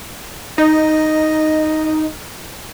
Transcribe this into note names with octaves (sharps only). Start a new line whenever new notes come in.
D#4 D#5